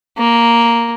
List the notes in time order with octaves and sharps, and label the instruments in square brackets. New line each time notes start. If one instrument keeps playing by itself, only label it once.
[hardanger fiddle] A#3